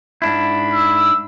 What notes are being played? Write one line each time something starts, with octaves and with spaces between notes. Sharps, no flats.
G#2 D4 E4 B5
E6